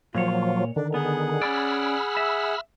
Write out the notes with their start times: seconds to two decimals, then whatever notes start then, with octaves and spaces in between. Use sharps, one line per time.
0.15 A#2 F3 F#3 F4 C#5
0.76 D3 D#3 D4
0.94 B3 G#4 F#5
1.42 C#4 D5 B5 E6 F6
2.17 E5